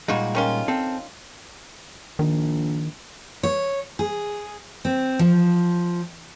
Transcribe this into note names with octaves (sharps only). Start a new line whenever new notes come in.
A#2 G3 G#3 D#4 F4 F#4
D#3 C#4 F4
C4 A4
A#1 D#3
C#5
G#4
C4
F3